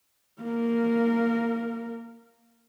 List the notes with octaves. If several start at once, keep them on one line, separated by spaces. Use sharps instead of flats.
A#3 A#4